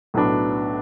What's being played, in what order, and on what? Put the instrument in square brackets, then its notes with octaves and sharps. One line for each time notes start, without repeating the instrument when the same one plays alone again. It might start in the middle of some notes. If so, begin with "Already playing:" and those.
[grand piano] B1 A2 F#3 B3 D4